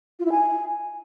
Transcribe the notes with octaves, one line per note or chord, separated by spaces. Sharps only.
F4
E4
G#5